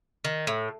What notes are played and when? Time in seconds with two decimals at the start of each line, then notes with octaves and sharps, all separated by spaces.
0.24 D#3
0.47 A2